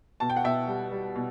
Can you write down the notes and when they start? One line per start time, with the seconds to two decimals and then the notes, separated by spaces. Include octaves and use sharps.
0.20 B2 A5
0.30 G5
0.36 F#5
0.44 B2 E5 G5
0.67 G3
0.91 G3
1.16 B2